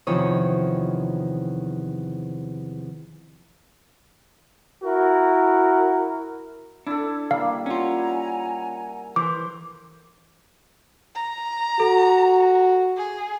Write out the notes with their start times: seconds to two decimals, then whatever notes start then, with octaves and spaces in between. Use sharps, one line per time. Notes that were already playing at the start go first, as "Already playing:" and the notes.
0.07 E2 C3 D#3 F3 C#5 D#6
4.82 E4 F#4 A#4
6.87 D4 E4 A4
7.31 G3 A#3 F5
7.66 C#4 F4 F#5 G#5 A#5
9.16 E3 B4 C5 D6
11.15 A#5
11.80 F#4 A4
12.96 G#4